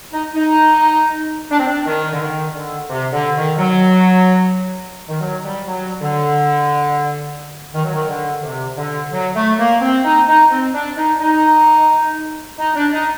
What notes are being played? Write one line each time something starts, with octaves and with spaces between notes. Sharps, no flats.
D#4
D#4
D4
C4
D4
D#3
D3
D#3
D3
C3
D3
D#3
F#3
D#3
F#3
G3
F#3
D3
D#3
F#3
D#3
D3
C3
D3
F#3
A3
A#3
C4
D#4
D#4
C4
D4
D#4
D#4
D#4
D4
D#4